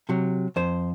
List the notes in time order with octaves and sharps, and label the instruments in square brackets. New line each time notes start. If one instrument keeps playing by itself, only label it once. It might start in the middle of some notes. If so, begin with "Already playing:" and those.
[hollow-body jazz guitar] C3 F#3
F2 C5